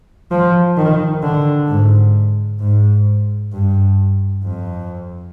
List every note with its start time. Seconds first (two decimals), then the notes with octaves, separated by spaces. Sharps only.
0.31 F3
0.77 D#3
1.23 D3
1.69 G#2
2.60 G#2
3.52 G2
4.44 F2